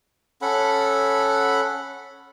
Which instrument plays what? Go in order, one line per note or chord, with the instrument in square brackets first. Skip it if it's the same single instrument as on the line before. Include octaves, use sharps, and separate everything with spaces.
[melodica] C#4 A4 F#5 B5